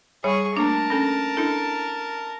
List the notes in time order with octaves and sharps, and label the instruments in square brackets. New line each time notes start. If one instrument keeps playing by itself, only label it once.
[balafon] G3 B5 [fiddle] G#4 C#6 [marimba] C#5
[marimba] A3 A#3 D4 [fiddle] A#4 A5
[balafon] C#4 A4 G#5
[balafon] D4 A4 [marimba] E4